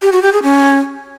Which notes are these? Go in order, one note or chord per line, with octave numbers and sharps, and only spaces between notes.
G4
F#4
G4
G#4
C#4